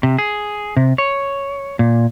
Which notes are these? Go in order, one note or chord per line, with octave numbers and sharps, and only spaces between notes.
C3
G#4
C3
C#5
A#2